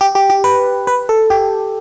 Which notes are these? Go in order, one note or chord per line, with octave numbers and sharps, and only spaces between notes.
G4
G4
G4
B4
B4
A4
G4